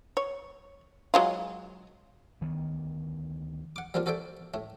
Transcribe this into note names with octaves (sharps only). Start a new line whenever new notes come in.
C#5
F#3 G#3 F4
D2 D#3 B3
F#5 D6
G3 A#3 C4 D4 F4
F#4 A4 C5 D5 E5 G5
A2 A3